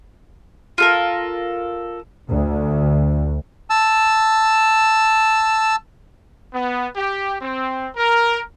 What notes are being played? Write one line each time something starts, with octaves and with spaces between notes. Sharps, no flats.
F4 A4 A#4
D2
A5 E6
B3
G4
C4
A#4